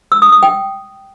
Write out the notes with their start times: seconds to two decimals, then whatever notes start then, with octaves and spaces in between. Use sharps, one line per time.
0.12 E6
0.22 D#6
0.32 D#6
0.43 G5